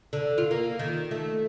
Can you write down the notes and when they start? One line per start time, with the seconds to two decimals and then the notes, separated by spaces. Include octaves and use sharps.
0.13 D3
0.38 F4
0.51 A#3
0.79 D#3
1.11 A3